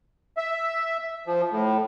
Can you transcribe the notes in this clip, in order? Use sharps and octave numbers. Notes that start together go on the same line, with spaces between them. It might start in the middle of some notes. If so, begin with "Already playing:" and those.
E5
F3
A2